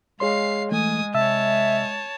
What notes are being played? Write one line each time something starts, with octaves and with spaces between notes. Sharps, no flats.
G#3 G#4 C#5 F5 C6 C7
E3 A3 G#5 D#6
C3 C#5 E5 A5 E6